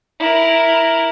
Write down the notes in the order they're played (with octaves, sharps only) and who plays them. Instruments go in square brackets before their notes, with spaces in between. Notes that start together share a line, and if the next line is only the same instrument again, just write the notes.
[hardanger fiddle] E4 A#4